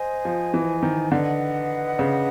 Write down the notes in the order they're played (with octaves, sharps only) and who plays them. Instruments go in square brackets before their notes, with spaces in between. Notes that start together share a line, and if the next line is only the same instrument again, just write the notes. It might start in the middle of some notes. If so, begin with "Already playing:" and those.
Already playing: [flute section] C5 D#5 G#5
[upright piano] F3
E3
D#3
[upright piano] D3 [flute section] B4 D#5 F#5
[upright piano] C#3